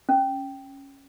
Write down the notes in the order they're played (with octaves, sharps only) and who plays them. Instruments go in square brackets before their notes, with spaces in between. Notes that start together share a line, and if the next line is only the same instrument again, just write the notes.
[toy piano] C#4